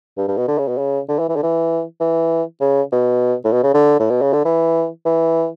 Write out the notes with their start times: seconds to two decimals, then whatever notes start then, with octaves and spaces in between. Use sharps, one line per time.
0.17 G2
0.28 G2
0.37 B2
0.48 D3
0.58 C#3
0.68 B2
0.78 C#3
1.09 D3
1.19 E3
1.29 E3
1.36 D3
1.43 E3
2.00 E3
2.61 C#3
2.92 B2
3.44 A2
3.52 B2
3.63 C#3
3.74 D3
3.99 A2
4.10 B2
4.21 C#3
4.33 D3
4.45 E3
5.05 E3